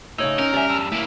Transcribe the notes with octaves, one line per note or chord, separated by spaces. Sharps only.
A2 C#3 D#4 C#5 E6
C#4 A#4
G3 D5 E5 G#5
E2 G2 E6
A2 A#3 E4